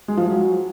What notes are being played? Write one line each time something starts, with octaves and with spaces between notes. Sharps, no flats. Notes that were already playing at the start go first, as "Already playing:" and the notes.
G#3
F3
F#3